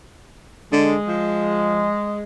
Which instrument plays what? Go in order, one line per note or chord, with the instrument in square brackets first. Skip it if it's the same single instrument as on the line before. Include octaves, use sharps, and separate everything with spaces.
[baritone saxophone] D3 [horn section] G#3
[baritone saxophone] F3